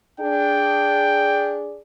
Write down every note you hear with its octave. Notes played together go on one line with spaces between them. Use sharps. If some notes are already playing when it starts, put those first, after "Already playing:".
D4 G#4 G5